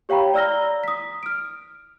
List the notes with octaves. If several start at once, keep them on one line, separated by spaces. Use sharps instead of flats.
G4 C#5 F5 G5 A#5 B5
D5 A#5 E6 F6 A#6 G7
D#6 B6
F6 D7